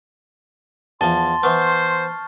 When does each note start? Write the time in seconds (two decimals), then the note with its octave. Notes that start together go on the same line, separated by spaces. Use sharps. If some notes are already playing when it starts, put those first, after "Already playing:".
1.01 E2 F3 A5 C6 A6 G7
1.43 E3 B3 C5 C#6 F6